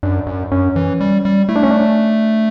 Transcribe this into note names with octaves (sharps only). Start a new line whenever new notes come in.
F#2 D4
F#2
F#2 C#4
E3
G3
G3
A3 E4
D4
C#4
D4